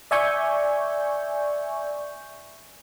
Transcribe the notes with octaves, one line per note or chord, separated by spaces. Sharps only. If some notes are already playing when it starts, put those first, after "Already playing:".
D5 E5 G#5 C#6 G6